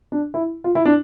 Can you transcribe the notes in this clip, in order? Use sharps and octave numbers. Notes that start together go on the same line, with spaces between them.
D4
E4
F4
E4
D4